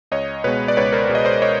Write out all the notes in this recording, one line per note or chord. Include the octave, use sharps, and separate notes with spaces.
C#2 C#5 D#5
B2 G#3 B3 B4 C#5
D5
C#2 B4 C#5
A#4 C5
B2 G#3 B3
D#5
C5 D5
C#5 D#5